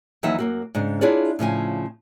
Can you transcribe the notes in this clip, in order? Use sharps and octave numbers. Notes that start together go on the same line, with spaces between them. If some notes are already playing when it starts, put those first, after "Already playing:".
D#2 E3 F#3 D#4 E5 F#5
F#2 A#3 F#4
G#2 C#3 D4
D4 E4 F4 G#4 C#5 D5
A2 C#3 F3 G#5